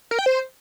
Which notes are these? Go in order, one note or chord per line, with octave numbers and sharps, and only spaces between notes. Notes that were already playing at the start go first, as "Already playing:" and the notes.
A#4
G5
C5